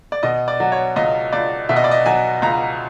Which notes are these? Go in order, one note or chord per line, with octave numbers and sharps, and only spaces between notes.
D5
B2 D#5
D5
F#3
C#5
C#2 D#5
C#2 D5
B2 E5
D#5
D5
D#5
F#3 G#5
C#2 A#5